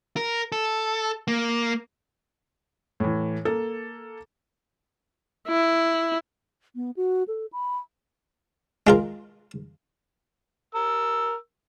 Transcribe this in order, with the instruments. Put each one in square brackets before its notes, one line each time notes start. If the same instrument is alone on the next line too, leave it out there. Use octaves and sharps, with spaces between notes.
[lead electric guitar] A#4
A4
A#3
[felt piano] A2 E3
A#3 A4
[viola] E4
[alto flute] B3
F#4
A4
B5
[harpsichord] G#3 F4 A#4
[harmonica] A#4 E6